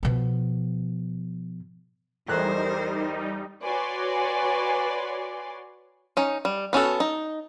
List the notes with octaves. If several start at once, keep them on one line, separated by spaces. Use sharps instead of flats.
B2 F3
E2 G3 A3 D#4 A#4 C5 F#6
F#4 B4 C#5 D5 G#5 C6
C#4 D#4
G3
B3 C#4 F#4 A4
D#4